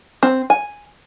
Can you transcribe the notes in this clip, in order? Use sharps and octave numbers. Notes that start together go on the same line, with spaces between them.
C4
G#5